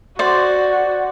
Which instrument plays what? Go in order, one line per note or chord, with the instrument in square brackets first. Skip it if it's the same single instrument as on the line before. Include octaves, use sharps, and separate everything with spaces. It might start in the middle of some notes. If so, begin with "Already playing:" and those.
[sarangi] F#4 [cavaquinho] C5 D5